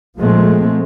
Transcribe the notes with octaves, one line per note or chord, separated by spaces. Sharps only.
A#2 F3 G#3 A3 C4